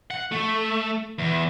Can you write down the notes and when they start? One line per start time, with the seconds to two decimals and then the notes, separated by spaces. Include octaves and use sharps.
0.10 F#5
0.32 A3
1.18 E2